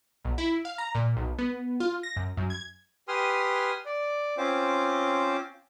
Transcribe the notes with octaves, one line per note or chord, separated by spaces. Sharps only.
B1
E4
F5
A#5
A#2
B1
B3
F4
A#6
F#2
F#2
G#6
G4 B4 G#5 C6 D#6 F6
D5
C4 C#4 F4 C5 D6